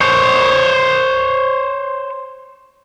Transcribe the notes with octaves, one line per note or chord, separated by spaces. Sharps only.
C5 C#5